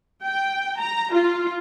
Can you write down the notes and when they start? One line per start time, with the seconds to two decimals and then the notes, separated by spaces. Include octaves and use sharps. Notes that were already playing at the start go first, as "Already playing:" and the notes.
0.24 G5
0.79 A#5
1.13 F4